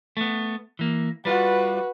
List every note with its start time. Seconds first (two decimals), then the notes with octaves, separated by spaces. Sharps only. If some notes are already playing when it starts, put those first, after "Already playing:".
0.17 A3 B3
0.79 E3 A#3
1.25 G3 F4 F#4 B4